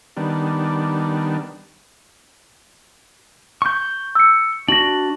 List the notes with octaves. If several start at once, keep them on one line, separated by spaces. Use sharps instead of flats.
D#3 G3 B3 D4
C#6 G6
E6 C#7
D4 F#4 A#6 F#7